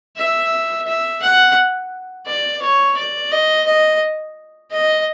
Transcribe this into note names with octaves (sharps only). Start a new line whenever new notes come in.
E5
E5
F#5
D5
C#5
D5
D#5
D#5
D#5